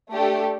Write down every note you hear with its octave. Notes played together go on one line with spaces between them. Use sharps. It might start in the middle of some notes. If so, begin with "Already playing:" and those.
A3 D4 G4